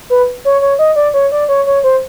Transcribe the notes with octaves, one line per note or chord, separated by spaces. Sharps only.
B4
C#5
C#5
D#5
D5
C#5
D5
C#5
C#5
C5